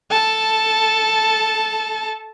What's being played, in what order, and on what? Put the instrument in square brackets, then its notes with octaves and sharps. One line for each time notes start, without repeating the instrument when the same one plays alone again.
[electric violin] A4 A5